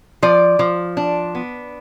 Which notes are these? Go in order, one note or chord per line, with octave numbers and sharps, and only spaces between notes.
F3 D5
F3
D4
B3